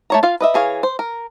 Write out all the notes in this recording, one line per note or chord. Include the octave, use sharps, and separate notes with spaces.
A3 C#5 A#5
F4 F5
B4 D#5 E5
E3 G#4 C#5 F5
C5
A#4